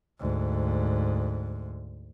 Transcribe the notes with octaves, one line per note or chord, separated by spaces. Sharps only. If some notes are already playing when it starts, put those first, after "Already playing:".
D2 G#2